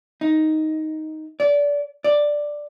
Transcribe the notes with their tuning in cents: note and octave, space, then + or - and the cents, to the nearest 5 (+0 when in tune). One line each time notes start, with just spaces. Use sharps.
D#4 +5
D5 -25
D5 +5